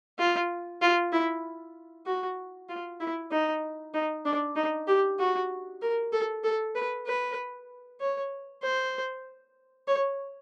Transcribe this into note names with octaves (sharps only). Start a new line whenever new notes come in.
F4
F4
E4
F#4
F4
E4
D#4
D#4
D4
D#4
G4
F#4
A#4
A4
A4
B4
B4
C#5
C5
C#5